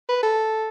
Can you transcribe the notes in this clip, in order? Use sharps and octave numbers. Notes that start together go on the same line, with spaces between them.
B4
A4